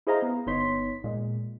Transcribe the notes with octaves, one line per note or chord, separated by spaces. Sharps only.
E4 G#4 C5 D#5 F5 A#5
B3
G1 B3 D#4 C#5 C6 B6
A#2 G#3